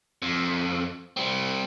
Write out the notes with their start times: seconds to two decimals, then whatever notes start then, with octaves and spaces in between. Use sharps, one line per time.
0.22 F2
1.17 G3 C4